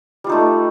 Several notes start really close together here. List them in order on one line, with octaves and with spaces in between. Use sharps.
G3 F4 D#4 A3